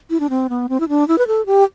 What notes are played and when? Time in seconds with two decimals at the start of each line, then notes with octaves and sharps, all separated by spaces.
0.10 E4
0.20 D4
0.30 C4
0.49 B3
0.69 C4
0.80 E4
0.89 D4
1.08 E4
1.18 B4
1.27 A4
1.46 G4